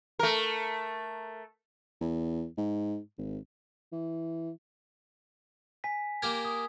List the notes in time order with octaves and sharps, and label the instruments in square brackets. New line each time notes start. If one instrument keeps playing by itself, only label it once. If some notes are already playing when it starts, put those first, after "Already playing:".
[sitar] A3 A#4
[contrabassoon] E2
G#2
G#1
E3
[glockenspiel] G#5 B6
[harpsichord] A#3 G4 A#4 [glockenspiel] G#6
[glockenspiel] D#6